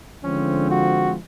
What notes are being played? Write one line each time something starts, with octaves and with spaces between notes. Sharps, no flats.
D3 F3 G#3 C4 C#4
F#4